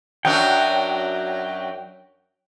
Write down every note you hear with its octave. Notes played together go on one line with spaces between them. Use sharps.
F#2 F#3 D4 G5